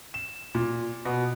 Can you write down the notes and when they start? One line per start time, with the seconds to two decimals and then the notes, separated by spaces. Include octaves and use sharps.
0.14 E7
0.55 A#2
1.05 B2